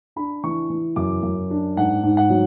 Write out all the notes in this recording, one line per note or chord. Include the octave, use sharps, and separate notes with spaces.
D4 B5
E3 C#6
E3
F#2 D6
F#2
D4
G#2 F#5
G#2
F#5
F#3